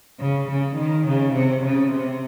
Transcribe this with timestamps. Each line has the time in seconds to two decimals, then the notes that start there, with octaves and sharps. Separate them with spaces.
0.20 C#3
0.50 C#3
0.78 D#3
1.07 C#3
1.35 C3
1.63 C#3
1.92 C3